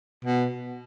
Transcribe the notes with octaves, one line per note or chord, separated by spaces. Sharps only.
B2